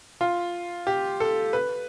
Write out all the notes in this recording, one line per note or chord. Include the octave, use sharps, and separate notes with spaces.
F4
G4
A4
B4